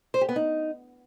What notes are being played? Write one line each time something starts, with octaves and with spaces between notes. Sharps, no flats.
C5
G4
B3
D#4